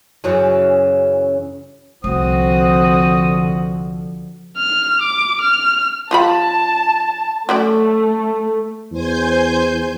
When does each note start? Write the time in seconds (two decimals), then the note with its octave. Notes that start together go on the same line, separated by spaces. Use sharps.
0.24 F#2 C#3 E3
2.04 C2 D3 F3 C4 F#4 D#6
4.57 F6
5.02 D6
5.42 F6
6.11 F3 F4 A5 B5
7.49 F#3 A3 C#4 D5
8.92 E2 C5 G#5 G6